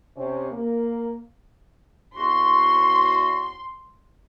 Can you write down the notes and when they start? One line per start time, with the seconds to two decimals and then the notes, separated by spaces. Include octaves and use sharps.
0.17 C3 C#4
0.51 A#3
2.17 E2 F#4 C6